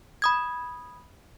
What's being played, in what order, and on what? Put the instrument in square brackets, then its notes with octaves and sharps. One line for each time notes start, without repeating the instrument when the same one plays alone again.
[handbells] B5 D#6 G#6